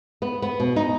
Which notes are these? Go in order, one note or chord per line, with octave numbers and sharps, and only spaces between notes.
B3
B3
B2
D#4